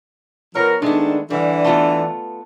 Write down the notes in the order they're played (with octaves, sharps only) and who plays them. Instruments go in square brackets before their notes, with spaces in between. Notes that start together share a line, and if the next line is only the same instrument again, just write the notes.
[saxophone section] F3 B3 A#4 [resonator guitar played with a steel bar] C#5
[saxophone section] D#3 A3 D4 [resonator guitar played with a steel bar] G#3 B3
[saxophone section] D3 E3 [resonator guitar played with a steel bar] G3
[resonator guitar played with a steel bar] A3 B3 F4